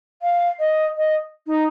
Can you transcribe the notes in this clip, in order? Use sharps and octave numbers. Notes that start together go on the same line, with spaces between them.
F5
D#5
D#5
D#4